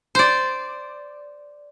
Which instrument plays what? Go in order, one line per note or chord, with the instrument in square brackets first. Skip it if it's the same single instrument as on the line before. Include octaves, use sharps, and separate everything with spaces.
[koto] C5 D5